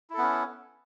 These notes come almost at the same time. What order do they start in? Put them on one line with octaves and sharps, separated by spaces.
E4 A4 B3 C#4